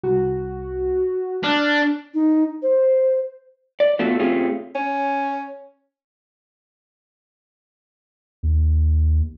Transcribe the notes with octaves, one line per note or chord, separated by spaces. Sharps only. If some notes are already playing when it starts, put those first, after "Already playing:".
C2 F#4
D4 F6 F#6
D#4
C5
D5
A3 B3 F4 F#4 A4
A3 C4 C#4 F4 G4 G#4
C#4
D#2